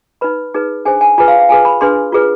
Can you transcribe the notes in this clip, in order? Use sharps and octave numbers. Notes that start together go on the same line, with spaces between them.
D#4 B4 B5
D#4 G#4 B4
D4 G#4 C5 G#5
G#5
F4 G#4 B4 G#5
F5
F5
F4 G#4 B4 G#5
B5
D4 G#4 B4 C6
F4 G#4 B4